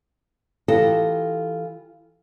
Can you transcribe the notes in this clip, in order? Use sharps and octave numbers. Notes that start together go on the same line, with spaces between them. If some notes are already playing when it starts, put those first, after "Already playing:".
E3 F4 G4 A4 D#5